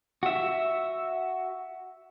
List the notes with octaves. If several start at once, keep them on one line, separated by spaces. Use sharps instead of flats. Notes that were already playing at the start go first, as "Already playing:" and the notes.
F#4 E5